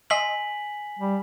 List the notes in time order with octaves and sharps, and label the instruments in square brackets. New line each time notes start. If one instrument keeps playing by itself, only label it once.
[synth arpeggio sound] D#5 C6 E6 [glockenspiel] G#5 B6 F#7
[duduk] G3